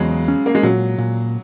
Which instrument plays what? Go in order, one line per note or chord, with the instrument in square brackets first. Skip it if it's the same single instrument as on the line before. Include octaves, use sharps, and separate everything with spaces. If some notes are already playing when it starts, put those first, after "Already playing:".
Already playing: [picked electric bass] E2 [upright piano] C#3 F#3 G#3
[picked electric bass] C#4
[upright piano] A#3
G#3
[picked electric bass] A#2 [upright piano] F#3
[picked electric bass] A#2